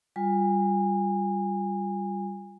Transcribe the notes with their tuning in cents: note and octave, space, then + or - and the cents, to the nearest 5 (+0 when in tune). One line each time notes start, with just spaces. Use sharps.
G3 +0 F4 +10 G#5 -25